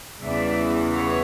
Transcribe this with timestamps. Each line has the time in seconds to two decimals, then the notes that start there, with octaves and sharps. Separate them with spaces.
0.22 E2 C#3 E3 G3 B3 D5 E5
0.93 C#5